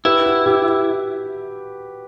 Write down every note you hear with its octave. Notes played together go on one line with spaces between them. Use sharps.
E4 G4 B4
F#4
G4